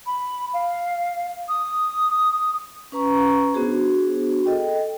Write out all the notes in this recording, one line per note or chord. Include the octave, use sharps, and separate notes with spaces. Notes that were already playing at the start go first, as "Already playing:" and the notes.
B5
F5
D#6
C#4 B4 A#5 C#6
B3 D4 F#4 G#4 C5
A4 D#5 G5